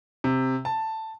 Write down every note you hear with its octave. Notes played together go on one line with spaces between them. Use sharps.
C3
A5